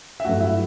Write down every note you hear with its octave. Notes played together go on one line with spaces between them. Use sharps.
E5
G2 F#3 A3 F#4 F#5
E4 E5